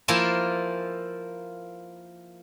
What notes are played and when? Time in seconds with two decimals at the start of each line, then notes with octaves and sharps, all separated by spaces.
0.08 F3 A#3 E4 F4 G#5 A5